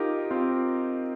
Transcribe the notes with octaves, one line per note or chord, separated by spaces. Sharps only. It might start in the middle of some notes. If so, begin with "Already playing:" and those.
Already playing: D#4 F4 G4 A#4
C4 F4